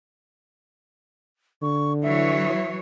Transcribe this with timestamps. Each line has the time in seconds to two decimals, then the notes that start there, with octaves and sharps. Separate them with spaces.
1.62 D3 C#6
2.03 E3 F#3 C#5 E5